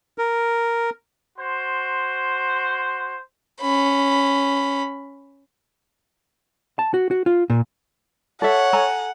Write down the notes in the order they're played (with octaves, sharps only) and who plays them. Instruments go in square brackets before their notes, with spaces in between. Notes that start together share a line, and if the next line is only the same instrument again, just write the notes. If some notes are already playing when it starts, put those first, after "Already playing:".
[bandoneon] A#4
[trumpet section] F#4 C5 C6
[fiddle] C#4 B5
[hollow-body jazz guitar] A5
F#4
F#4
F4
A#2
[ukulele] A4 E5 [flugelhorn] C#5 [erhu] F#5
[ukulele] A4 G#5 A#5